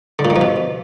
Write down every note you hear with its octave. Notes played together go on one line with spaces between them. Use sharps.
D3
A#2
D#3
F3
B2